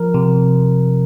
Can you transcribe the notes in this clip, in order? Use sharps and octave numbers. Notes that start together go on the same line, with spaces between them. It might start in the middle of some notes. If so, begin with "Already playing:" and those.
Already playing: F3 A#4
C3